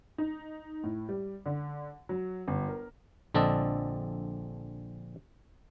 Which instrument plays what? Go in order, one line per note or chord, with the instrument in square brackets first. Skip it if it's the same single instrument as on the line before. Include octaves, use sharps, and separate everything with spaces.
[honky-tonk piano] D#4
A2
G3
D3
F#3
G1
A#4
[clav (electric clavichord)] A#1 D3 C4 D4 A4 D#5